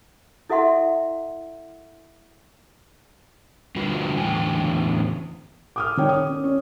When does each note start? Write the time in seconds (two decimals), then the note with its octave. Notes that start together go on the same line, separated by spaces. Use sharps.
0.50 E4 A4 E5 F#5 C6
3.76 D3 G3 F4 F#4 B4
4.17 E2 A2 D3 E3 G5 G#5
5.76 D6 D#6 F6
5.97 D#3 C#5 G5
6.09 D#6
6.29 C#4
6.44 C#4